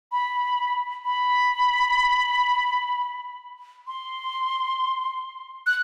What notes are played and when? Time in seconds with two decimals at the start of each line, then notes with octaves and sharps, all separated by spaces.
0.12 B5
1.05 B5
3.87 C6
5.67 F#6